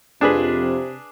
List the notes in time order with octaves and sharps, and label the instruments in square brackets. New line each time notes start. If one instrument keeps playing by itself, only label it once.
[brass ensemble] F2 C4 F4 [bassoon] C3 [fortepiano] D4 G#4 B4